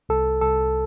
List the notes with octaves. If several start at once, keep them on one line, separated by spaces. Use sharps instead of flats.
C2 A4
C2 A4